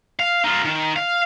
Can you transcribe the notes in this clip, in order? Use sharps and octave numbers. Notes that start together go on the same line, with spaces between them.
F5
D#4 F4
D#3
F5